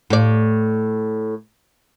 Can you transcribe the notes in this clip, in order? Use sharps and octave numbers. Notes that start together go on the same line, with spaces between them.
A2 D5